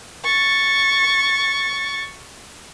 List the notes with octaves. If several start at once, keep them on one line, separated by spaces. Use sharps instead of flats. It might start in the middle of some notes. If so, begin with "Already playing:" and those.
C#6 A6